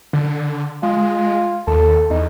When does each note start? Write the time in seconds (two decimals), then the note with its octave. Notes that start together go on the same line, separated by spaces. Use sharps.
0.13 D3
0.83 G#3 F4
1.67 D#2 A4
2.10 E2 D#4